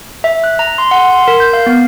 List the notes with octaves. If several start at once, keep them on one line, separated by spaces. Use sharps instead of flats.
E5
F#6
A#5
C6
F#5
C6
A#4
G6
F5
B3